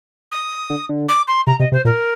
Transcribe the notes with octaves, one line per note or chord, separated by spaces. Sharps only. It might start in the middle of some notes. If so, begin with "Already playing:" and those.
D#6
D3
D3
D6
C6
C3 A#5
C3 D#5
C3 C5
A#2 A#4